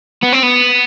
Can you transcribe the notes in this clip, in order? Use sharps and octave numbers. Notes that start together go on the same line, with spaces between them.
B3
C4
B3